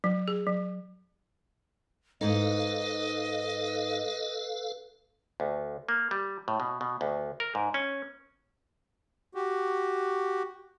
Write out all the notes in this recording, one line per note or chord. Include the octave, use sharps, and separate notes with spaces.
F#3
G#4
F#3
G#2 D#4 A4 B4 D#5 F5
D2
A#3
G3
A2
B2
B2
D2
A#4
G#2
C#4
F#4 G4